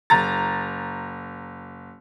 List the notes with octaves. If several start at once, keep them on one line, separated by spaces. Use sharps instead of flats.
F#1 A#5 A6